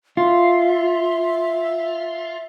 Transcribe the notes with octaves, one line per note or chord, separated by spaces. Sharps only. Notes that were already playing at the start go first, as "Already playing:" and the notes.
F4 E5